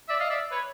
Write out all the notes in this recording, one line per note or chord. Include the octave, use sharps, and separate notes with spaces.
D5 E5
D#5 F5
D5 E5
B4 C#5